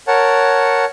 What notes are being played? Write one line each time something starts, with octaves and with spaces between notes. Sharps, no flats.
A#4 C#5 F#5 A5